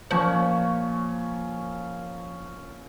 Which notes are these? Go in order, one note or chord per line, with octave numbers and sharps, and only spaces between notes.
A#2 F3 C#4 C#6